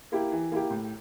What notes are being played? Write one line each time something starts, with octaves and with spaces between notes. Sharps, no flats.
A#3 E4 G4
E3
A#3 E4 G4
A2